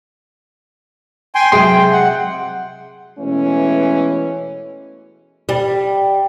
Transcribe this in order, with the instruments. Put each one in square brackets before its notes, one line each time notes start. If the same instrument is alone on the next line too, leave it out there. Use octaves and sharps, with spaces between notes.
[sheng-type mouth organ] G5 G#5 C6
[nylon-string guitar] C3 F#3 G#3 [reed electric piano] G#4 C6 [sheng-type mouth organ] G5
[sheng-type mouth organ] F#5
[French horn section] B2 E3 G#3 A3 C#4
[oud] G3